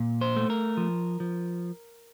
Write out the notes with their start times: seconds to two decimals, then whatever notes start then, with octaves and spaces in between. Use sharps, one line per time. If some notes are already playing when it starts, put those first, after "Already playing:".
Already playing: A#2
0.21 C5
0.36 A3
0.50 A#4
0.77 F3
1.20 F3